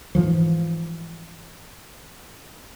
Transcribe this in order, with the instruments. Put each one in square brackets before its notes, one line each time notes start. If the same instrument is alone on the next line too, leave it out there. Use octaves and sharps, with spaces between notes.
[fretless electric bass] G#2 E3 F3